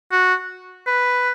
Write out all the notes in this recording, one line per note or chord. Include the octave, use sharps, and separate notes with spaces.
F#4
B4